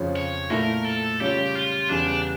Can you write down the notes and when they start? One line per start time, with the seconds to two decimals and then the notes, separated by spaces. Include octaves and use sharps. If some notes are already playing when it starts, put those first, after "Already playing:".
Already playing: F2 C#3 F3 C#4 F4
0.16 C#5
0.50 A#2 A3 E4 A#4
0.85 A4
1.20 C#3 G3 C#4 F4 G4
1.55 F4
1.89 E2 C#3 G3 D4